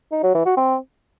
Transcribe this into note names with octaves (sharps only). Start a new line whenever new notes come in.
D#4
F#3
E3
F#4
C4